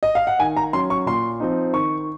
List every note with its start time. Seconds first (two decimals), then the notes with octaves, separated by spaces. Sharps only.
0.03 D#5
0.15 F5
0.27 F#5
0.39 D#3 G#5
0.57 A#5
0.73 F#3 C#4 C6
0.90 C#6
1.06 A#2 C6
1.40 F3 C4 D#4
1.74 D#3 C#6